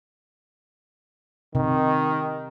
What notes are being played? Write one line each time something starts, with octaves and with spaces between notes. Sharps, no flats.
C3 D#3